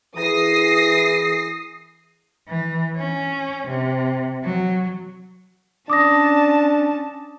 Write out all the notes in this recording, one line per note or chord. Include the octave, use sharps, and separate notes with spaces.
E3 G#4 D#6 A#6 C7
E3
C#4
C3
F#3
C#4 D4 A5 D6 D#6 A#6